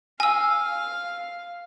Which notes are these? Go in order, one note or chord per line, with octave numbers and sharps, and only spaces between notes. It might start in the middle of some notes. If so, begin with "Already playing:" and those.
F5 G#5 E6